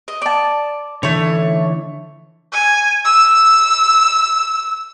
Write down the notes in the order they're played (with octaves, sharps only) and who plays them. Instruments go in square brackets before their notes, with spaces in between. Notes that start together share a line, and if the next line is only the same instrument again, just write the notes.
[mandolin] D#5
D5 A5
[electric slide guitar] D3 E3 [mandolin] A3 C#5
[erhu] G#5
E6